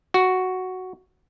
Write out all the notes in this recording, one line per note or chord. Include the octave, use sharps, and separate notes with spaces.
F#4